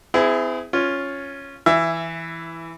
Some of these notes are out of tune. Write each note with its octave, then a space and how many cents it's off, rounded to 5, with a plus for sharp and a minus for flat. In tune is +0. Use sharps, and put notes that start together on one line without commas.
C4 -45 E4 +0 G#4 +0
C#4 +0 F4 +0
E3 +0 E5 +20